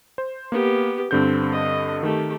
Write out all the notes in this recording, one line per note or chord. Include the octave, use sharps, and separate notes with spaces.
C5
A#3 B3 G4
G2 D3 C4 G6
D#5
D#3 A3 G4